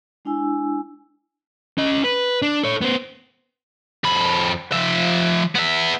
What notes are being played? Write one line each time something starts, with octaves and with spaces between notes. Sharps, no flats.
G#3 D4 E4 G#5 E6
C#4 D#5
B4
D4
A4 C#5
B3 C5
F2 B5
F3 E5
B3 E5